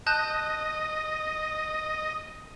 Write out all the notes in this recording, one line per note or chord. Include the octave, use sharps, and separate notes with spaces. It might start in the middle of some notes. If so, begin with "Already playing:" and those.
D#5 A5 F#6 G6